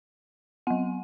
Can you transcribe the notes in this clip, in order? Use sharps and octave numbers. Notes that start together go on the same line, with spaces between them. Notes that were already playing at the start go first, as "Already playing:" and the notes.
F#3 B3 F#5